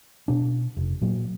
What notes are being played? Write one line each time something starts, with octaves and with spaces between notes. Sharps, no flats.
B2 D4
F1
A#2 F#3